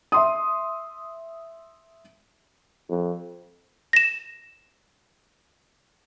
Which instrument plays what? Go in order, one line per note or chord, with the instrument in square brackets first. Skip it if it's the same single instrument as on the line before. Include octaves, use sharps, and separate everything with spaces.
[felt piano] E5 C6 D#6
[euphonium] F2
[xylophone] A#6 E7